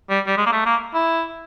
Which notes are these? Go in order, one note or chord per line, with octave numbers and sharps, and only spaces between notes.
G3
G3
G#3
A#3
A3
A#3
E4